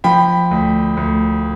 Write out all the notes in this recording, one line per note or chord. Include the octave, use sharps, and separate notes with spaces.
F3 G5 B5
D2
D2